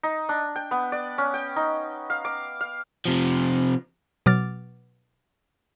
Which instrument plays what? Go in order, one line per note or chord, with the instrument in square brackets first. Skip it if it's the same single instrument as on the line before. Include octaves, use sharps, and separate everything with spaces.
[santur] D#4
D4
G5
B3
D5
C#4
G5
D#4
F5
D6
F5
[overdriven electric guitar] C3 F3
[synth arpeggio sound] B2 F#3 D6 F6 A6